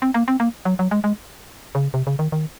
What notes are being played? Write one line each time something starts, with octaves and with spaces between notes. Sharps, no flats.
C4
A#3
C4
A#3
F#3
F#3
G#3
G#3
C#3
C3
C#3
D#3
D#3